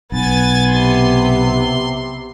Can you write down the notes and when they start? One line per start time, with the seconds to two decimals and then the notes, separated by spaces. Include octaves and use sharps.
0.12 B1 B3 G#5 A6
0.66 C3 C6